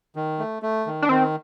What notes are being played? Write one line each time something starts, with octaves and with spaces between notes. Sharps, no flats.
D#3
A3
A3
D#3
D4
D#3 C4